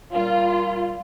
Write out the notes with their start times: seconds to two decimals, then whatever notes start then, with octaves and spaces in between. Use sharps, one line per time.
0.14 A#2 G3 F4